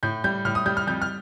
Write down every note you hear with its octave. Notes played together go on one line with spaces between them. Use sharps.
A2 G6
G3 G6
A2 F6
D#6
G3 G6
F6
F2 G6
F6